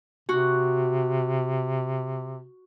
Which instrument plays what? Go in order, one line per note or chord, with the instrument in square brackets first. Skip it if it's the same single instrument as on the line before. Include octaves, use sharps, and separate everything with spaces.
[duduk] C3 [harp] F#4